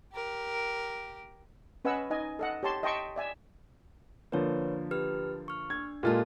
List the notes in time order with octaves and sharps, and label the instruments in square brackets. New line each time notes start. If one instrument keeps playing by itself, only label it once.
[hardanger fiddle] G4 A#4
[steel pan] C#4 B4 D#5 F#5 G#5 E6
D#4 D#5 G#5
A4 D#5 F#5
G4 C#5 A5 C6
D#5 E5 G5 A5 C6 C#6
D5 E5 G#5
[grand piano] D3 F3 A#3 [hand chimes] B4 C#5
[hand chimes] G4 B4 F6
C#6 F6
[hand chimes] D4 [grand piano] G#6
[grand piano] A#2 G#3 F4 [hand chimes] G4 A4 A5